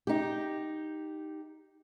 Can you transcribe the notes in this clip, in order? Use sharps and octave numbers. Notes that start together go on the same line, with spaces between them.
D#4 G4